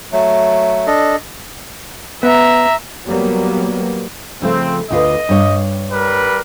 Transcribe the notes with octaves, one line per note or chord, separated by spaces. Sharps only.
F#3 A3
D4 A4 D#5
B3 E5 A#5
F#3 G3 A#3 B3
C#3 F3 A3 C4
D2 F4 B4 D#5
G2 C#5
G3 A#4 B4